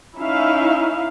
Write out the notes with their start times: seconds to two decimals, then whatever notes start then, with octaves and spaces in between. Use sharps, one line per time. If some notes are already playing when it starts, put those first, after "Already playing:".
0.17 C#4 D#4 E4 E5 F5